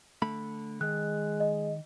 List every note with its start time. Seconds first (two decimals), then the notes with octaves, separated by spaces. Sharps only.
0.22 D3 A3 B5
0.81 D#3 G#3 F#6
1.40 D#5